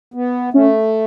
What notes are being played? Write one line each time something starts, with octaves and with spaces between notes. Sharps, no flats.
B3
A3 C#4